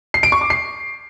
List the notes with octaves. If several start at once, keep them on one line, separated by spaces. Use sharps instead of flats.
C7
D7
C#6
D6
C7